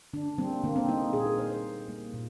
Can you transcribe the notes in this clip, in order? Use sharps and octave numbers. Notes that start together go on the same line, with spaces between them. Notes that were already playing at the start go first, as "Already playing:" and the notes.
D3 D4
G3 A#3 C4
D3 A#3
C4
G3 A#3 D#4
A#2 G#4
A#4
G3 A#3 C5
C5
A#2
G3 A#3
A#2